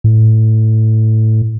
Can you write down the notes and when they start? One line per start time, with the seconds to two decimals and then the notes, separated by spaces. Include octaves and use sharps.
0.04 A2